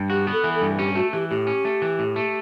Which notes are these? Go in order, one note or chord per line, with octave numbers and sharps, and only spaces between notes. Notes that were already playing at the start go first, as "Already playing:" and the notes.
Already playing: G2
F#4 G4
B3
A4
E3
A4
G2
C#4 G4
A3 F#4
E3 G4
A2 G4
C#4
A3
E3
A2
A3